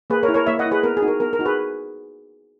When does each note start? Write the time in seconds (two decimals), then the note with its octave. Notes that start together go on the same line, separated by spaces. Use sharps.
0.10 A#3 G#4 B4
0.23 A#4 C#5
0.28 E4
0.34 A#4 C#5
0.47 A#3 C#5 E5
0.59 D#5 F#5
0.66 E4
0.71 G#4 B4
0.83 B3 A#4
0.97 G#4
1.02 D#4 F#4
1.08 A#4
1.20 B3 A#4
1.33 A#4
1.39 D#4 F#4
1.46 G#4 B4